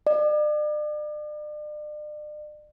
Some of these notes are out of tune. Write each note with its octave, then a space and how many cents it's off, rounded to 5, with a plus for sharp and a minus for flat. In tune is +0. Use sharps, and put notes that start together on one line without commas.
D5 +40